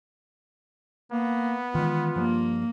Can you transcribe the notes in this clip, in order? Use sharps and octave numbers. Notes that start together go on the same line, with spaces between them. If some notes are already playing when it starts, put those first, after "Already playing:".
A#3 B3
D#3 E3 G#3 F4
G2 F3 A#3